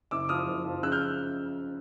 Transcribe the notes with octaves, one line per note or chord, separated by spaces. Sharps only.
F#1 D6 E6
F3 D#6 F6
F#1
F3
C#3 E6 F#6
F6 G6